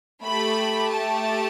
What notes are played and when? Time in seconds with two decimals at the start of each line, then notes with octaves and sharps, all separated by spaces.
0.24 A3 G4 B5
0.91 A5